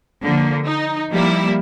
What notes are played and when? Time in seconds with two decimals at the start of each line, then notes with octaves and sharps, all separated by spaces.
0.23 D3 F3 A#3
0.66 D#4
1.10 F3 G3 A#3 E4